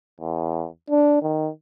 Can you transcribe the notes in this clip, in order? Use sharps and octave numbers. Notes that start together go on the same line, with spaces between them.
E2
D4
D#3